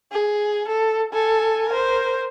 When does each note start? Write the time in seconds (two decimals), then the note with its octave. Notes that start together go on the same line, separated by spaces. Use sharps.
0.12 G#4
0.68 A4
1.13 A4 G#5
1.69 A#4 C5